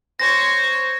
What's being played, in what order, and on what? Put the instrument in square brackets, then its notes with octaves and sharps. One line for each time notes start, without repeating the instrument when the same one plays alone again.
[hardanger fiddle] C5 C#5 [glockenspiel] A#6